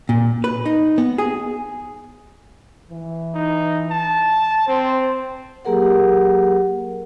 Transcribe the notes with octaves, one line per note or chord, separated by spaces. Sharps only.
A#2
B4
D#4
B3
G#4
E3
D#4
A5
C4 C5
F#3 A#3 G4 G#4 A#4 F#5